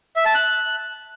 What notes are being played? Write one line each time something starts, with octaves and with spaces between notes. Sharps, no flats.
E5
A5
F#6